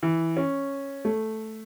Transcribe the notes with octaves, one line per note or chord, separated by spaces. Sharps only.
E3
C#4
A3